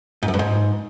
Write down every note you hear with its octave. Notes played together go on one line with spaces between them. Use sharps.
G#2
F#2
G2
G#2